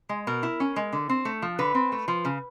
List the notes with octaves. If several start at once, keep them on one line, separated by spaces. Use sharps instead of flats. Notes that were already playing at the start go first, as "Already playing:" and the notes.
G#3
B2 A#4
E4
C#4
G#3
D3
C4
A3
F3
D3 B4
C4
A3
F3
C#3